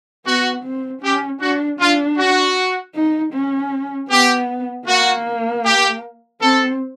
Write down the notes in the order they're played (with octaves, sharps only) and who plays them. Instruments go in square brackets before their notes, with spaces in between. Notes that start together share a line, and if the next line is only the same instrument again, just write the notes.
[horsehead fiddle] B3 [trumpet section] F#4
[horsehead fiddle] C4
[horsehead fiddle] C#4 [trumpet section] G4
[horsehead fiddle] D4 [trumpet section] F#4
[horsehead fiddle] D4 [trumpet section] F4
[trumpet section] F#4
[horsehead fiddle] D#4
C#4
[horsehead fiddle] B3 [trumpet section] G4
[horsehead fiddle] A#3 [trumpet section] F#4
[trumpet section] G4
[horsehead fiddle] C4 [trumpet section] A4